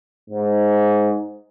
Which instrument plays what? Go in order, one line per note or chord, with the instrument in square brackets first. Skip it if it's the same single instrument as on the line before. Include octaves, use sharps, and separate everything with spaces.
[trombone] G#2